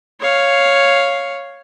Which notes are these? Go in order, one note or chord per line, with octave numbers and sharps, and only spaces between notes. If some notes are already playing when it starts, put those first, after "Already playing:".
C#5 F5